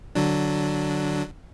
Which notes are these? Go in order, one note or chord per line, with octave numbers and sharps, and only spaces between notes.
D3 F#3 D4